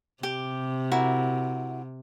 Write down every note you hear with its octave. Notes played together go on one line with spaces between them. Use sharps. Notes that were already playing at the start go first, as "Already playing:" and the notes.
C3 G4
E4 F#4 A#4